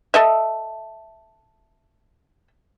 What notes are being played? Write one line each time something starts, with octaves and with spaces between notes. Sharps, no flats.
A4 D#5 E5